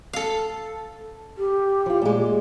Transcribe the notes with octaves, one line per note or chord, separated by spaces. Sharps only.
A4 F5
G4
F3 F4
A#2 G#3